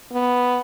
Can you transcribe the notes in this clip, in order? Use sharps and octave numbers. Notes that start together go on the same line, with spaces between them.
B3